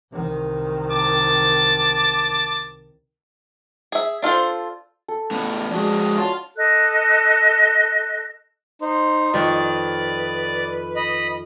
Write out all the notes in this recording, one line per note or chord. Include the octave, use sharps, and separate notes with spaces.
C2 D#3
A5 D6
G#4 E5
D4 F4 A4 C5
A4
A2 B3
F2 G#3 D4 F#4
F4 C#5 A5
A4 D#5 F#6
D#4 C5
F2 D#3 B4 D5
D#5 B5